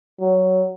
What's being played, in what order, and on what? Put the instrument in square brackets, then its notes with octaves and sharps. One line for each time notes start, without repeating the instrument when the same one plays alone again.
[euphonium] F#3